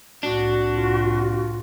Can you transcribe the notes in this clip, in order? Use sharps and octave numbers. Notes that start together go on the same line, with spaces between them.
C2 A2 D4 F#4
F4